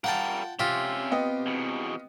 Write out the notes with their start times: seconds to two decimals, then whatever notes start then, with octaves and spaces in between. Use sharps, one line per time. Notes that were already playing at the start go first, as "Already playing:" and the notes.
0.04 G3 F4 A#4 F#5 G5 A5
0.59 C3 C#4 F4 G4 E5
1.12 B3 D#5 G5
1.46 E2 B2